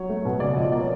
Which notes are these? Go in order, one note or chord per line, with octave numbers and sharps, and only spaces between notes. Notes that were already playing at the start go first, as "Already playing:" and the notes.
Already playing: F#3 C#5
A3
B2
C#3 D5
F3 D#5
A#3 D5
C#5